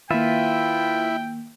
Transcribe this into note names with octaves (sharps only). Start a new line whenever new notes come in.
D#3 A#3 E4 F4 B4 E5 G5